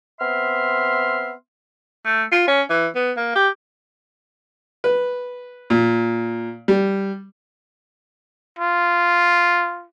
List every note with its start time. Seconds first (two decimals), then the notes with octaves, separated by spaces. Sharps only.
0.20 B3 C4 E5 C6 F6
2.05 A3
2.32 F4
2.48 C#4
2.70 E3
2.95 B3
3.16 A#3
3.35 G4
4.84 B4
5.70 A#2
6.68 G3
8.59 F4